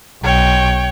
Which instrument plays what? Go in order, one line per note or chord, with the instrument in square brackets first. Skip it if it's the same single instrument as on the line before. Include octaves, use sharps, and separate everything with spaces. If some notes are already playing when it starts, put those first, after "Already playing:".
[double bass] B1 [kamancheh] C#5 G5